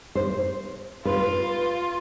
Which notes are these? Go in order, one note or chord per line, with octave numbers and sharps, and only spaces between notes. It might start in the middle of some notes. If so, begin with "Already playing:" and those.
C5
F4 B4